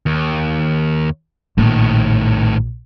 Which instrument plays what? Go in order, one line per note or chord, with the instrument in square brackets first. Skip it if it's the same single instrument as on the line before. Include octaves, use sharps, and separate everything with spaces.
[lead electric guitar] D#2
[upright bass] A#1 A#3 [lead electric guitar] A2 D#3